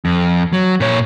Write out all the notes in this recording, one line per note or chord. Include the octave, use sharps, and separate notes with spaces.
F2
F#3
A#2 C#5